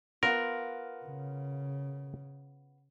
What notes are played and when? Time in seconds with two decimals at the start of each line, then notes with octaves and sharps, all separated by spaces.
0.23 B3 F4 A#4
1.05 C#3